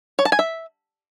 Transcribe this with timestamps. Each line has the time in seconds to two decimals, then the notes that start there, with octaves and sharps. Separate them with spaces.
0.19 C#5
0.25 A5
0.32 G#5
0.39 E5